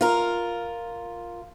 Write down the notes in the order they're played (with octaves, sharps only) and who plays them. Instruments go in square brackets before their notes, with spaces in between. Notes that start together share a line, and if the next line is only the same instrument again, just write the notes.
[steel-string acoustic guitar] F4 A#4